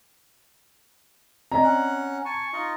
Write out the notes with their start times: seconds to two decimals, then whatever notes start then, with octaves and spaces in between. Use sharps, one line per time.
1.52 C4 D5 D#5 A#5
1.64 C#4 F#5 F#6
2.26 G#5 A5 C#6
2.53 D#4 F4 D#5